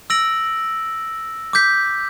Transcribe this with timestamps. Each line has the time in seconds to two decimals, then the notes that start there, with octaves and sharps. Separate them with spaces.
0.10 E6 A#6 D7 F#7
1.53 D6 G6 B6